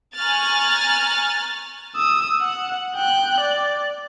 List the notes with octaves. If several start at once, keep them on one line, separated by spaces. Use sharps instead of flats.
G#5 A#5 C#6 F6 F#6 A6
D#6 E6
F#5
G5 F#6
D5